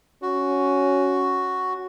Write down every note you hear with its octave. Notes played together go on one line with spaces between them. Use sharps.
C#4 F#4